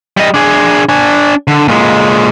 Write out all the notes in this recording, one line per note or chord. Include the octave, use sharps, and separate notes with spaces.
G3 D#5
D4 G#4
D4 G#5
D3
A#2 G#3